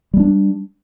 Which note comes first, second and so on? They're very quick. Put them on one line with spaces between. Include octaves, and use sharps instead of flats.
G3 A3 D4